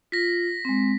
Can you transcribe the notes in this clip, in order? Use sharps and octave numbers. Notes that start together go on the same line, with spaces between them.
F4 A#6 B6
G#3 C4